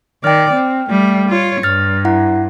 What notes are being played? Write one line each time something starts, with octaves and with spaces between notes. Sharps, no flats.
D#3 D5 G5 F6
C4
G3 A3
F4 C#5
G2 F6 A6
E4 F#5